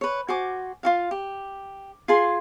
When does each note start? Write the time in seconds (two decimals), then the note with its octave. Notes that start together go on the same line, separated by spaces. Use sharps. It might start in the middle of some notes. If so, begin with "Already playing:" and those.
0.01 B4 C#5
0.28 F#4 C5 G#5 D6
0.83 F4 F#4 F5
1.11 G4
2.08 F4 G#4 C6